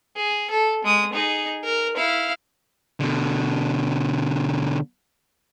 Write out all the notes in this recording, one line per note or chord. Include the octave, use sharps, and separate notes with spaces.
G#4
A4
G#3 D#6
D#4 G#4
A#4
E4 F5
B2 D3